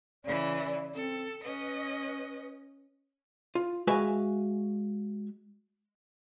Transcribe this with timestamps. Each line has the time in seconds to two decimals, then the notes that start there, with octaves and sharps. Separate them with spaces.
0.25 C#3 E3 D5
0.94 C4 A4
1.44 C#4 B4 D#5
3.55 F4
3.87 G#3 F#4 B4 E5 F5 G#5